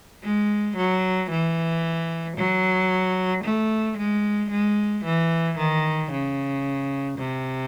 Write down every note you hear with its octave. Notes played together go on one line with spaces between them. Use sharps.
G#3
F#3
E3
F#3
A3
G#3
G#3
E3
D#3
C#3
C3